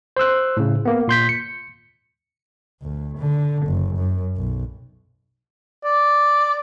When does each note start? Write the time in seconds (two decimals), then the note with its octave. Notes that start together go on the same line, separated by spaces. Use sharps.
0.17 C5 C6 E6 F#6
0.57 A2 C#3
0.85 A#3 B3
1.08 A#2 C6 G6 B6
1.29 C#7
2.82 D2
3.18 D3
3.67 F#1
3.97 F#2
4.37 B1
5.85 D5